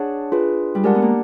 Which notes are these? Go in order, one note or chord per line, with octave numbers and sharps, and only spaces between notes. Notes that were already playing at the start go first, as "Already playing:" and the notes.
Already playing: D4 G#4 C#5 F#5 A5
F4 G#4 B4
G3
G#3 G4 A#4 D5 F#5 A5
B3
A#3